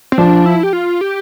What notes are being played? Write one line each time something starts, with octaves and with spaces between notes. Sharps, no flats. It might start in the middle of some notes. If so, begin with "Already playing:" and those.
C4
F3 D4
E4
G4
F4
G4